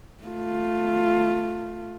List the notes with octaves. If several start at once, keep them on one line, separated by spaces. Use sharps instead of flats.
A3 F4